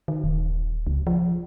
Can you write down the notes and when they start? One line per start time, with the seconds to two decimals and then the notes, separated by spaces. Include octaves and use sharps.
0.08 D#3
0.24 D#1
0.87 C#2
1.07 F3